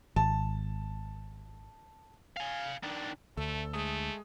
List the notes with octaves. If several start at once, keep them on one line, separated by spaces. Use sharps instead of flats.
G#1 A5
F5 G#5
D#3 D4
D2 A3 A4
G#3 A3 D#6